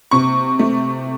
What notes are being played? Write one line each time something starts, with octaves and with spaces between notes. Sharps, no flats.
C3 C#6
A3